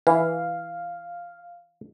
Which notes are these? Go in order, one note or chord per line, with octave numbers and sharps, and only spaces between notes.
E3 F5